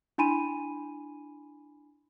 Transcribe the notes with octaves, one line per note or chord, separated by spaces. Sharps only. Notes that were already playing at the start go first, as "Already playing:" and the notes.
D4 E4 G#5 B5 C6 D#7